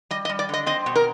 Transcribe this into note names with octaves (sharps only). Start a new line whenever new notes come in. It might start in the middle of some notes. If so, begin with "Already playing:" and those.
G3 D#5
D#5
G3
D5
D3 D#5
C4 D#5
B2
A#4